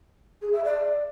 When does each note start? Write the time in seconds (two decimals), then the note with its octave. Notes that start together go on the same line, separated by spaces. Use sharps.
0.42 G#4
0.53 E5
0.64 D5